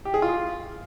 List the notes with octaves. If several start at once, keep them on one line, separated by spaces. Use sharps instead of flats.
G4
G#4
F4